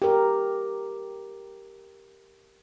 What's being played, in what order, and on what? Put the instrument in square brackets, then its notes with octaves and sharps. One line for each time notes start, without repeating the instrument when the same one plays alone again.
[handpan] G4 A#4